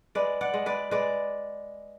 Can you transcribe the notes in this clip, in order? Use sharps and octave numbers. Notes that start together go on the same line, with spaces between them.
G#3 B4 D5
D5 F#5
G#3
B4 D5
G#3 B4 D5